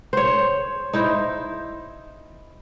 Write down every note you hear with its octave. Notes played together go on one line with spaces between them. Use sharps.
C5 C#5
D#4 E4 C5